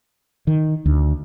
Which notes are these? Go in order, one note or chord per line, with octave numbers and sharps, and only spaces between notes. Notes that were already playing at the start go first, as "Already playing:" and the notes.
D#3
D2